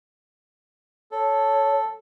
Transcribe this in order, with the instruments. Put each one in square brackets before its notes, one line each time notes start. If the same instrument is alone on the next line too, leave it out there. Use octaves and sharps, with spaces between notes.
[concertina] A4 [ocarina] C#5